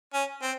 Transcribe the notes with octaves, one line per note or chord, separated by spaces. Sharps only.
C#4
C4